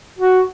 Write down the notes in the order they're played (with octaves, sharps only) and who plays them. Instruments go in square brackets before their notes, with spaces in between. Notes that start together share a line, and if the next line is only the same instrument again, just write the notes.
[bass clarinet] F#4